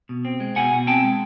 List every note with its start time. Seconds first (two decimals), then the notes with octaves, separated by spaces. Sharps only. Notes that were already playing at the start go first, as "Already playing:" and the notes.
0.09 B2
0.25 C4
0.40 G#3
0.56 B2 F#5 G#5
0.72 B2
0.87 C4 G5 A5
1.03 G#3